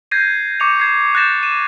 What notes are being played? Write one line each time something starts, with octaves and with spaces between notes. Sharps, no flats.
G6 G#6 A#6 C7 D#7
C#6 D6 C#7 D#7 F7
G#6 C7
F#6 G6 A6 A#6 E7
D#7 E7